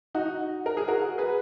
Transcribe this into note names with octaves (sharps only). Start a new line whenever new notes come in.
D#4 F#4
A#4
G#4
F#4 A#4
G#4 B4